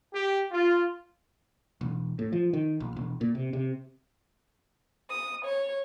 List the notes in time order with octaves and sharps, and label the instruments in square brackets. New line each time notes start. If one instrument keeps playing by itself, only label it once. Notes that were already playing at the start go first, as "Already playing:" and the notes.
[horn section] G4
F4
[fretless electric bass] E1
A2
F3
D#3
A#1
E1
A#2
C3
C3
[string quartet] D#6
C#5